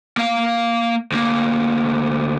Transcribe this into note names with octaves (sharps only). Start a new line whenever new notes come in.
A#3 F5
D2 A#3